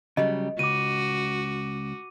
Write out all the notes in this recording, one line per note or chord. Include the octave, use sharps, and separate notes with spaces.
C#3 F#3 G3 D#5
C#2 F#4 D6 D#7